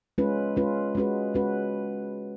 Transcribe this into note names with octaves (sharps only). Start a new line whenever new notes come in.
G#3 C#4 F4 B4
G#3 C#4 F4 B4
G#3 C#4 F#4 B4
G#3 C#4 F#4 B4